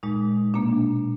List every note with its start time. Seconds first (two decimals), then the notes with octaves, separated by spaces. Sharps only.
0.03 A#2 G#3 D#4
0.54 B2 A#3 D4